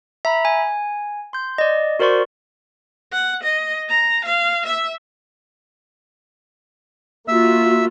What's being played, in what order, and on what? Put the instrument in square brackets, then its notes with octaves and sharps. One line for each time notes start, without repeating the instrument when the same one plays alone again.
[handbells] E5 A#5 B5
G#5
C6 G6
D5 D#5
F#4 A#4 C5 D5 C6 C#6
[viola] F#5
D#5
A#5
F5
E5
[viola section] A#3 F4 F#4 [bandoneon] E5 E6